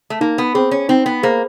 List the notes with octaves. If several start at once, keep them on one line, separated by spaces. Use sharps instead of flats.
A3
A#3 D#4
B3
C4 G#4 C5
C#4
C4 D#4
B3
A#3 G#4 C5